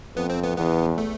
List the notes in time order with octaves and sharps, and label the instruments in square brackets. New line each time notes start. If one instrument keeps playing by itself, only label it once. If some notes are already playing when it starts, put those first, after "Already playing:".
[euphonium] F2 [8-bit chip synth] B3
[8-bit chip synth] C4
B3
[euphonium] E2 [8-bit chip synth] B3
[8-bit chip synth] A3